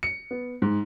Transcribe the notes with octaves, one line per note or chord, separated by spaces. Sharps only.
C#7
B3
G#2